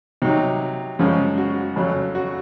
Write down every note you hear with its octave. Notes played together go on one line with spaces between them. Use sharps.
C3 F#3 D#4
F#2 C#3 F3 G#3 F4
F#4
F2 C#3 F#3
F#4